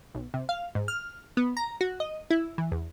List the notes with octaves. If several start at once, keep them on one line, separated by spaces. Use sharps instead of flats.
B1
C3
F5
G#2
F6
B3
A#5
F#4
D#5
E4
E3
E2